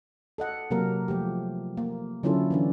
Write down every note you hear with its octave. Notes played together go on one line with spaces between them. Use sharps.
A4 D#5 F#5
C3 F#3 A#3 A#4
F3 A3 G4
A#3
D3 F#3 C#4 E4 F4 A4
E3 C#4 D4